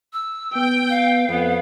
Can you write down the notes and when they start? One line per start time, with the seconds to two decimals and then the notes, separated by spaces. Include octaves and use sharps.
0.13 E6
0.56 B3 G5
0.90 F5
1.29 F2 B3